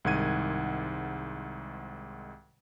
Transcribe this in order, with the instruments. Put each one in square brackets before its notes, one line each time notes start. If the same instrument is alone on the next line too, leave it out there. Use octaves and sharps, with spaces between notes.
[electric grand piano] C2 G#2 D#3 F#5 G#6 D#7